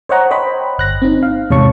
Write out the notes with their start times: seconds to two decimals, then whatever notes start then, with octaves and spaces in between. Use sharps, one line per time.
0.09 C5 C#5 D#5 F#5 A#5
0.31 C5 C#5 D#5 G5 B5
0.78 G1 F#6 A#6
1.02 C4 D#4
1.23 F5
1.50 E2 G#2 C3 C#5 A5 C#6